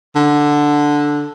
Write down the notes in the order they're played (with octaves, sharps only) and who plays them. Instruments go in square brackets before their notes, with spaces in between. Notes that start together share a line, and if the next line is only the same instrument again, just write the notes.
[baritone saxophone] D3